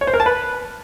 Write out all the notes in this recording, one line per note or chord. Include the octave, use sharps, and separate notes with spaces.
C#5
C5
A#4
A5
B4